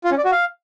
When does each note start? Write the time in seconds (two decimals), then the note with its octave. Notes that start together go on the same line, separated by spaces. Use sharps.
0.04 F4
0.11 C#4
0.18 D5
0.25 F#4
0.32 F5